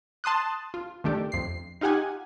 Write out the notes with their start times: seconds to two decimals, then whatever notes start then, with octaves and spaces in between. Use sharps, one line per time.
0.24 A5 C6 D#6 F#6
0.74 F4
1.04 D#3 A3 D4 G4
1.32 F2 C7
1.81 D#4 F4 G4 F#5 G#5